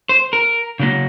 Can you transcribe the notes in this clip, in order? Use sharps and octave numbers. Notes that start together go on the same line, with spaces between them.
C5
A#4
C#3 F#3 A#3